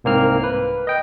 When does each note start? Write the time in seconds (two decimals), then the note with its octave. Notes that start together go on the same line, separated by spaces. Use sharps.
0.04 C2 G#2 A#3 C4 F6
0.44 B4
0.87 D#5 G5